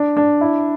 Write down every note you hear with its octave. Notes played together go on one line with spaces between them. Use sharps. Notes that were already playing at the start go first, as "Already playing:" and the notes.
Already playing: D4
D4
E4